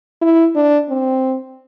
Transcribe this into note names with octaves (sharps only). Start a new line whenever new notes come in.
E4
D4
C4